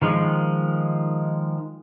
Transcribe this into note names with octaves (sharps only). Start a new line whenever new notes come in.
D#3 F3 G#3